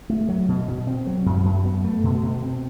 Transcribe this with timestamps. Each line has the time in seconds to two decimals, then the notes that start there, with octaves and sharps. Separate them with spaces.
0.10 A3
0.29 F#3
0.48 B2
0.68 B2
0.87 C4
1.07 F#3
1.26 F#2
1.45 F#2
1.65 B3
1.84 A3
2.04 B2
2.23 B2
2.43 C4